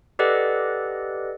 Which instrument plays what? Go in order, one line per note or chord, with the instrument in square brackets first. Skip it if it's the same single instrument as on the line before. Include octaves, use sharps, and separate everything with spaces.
[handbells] G4 A4 B4 D5 D#5 F#5